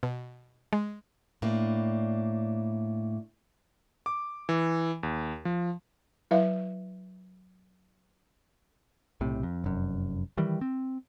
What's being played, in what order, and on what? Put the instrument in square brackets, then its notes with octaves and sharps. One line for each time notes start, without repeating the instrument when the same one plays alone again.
[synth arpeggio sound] B2
G#3
[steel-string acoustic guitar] A2 A#3 D4
[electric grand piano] D6
E3
D#2
F3
[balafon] F#3 E4 B4 E5 F5
[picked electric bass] B1 A2 C3
F2
F1 F#2
D#3 E3 G3
C4